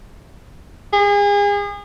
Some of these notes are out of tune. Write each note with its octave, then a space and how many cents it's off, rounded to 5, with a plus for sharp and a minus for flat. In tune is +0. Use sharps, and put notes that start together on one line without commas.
G#4 -35